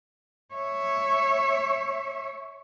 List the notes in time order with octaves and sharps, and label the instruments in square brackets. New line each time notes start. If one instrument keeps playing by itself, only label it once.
[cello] C#5 E5